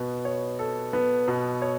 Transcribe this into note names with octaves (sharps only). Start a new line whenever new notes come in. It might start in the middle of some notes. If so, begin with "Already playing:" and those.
Already playing: B2 B3
C#5
A4
B3
B2
C#5